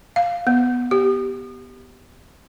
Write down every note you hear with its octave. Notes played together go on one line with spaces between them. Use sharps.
F5
B3
G4